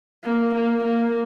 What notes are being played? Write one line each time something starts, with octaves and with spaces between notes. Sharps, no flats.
A#3
A#3
A#3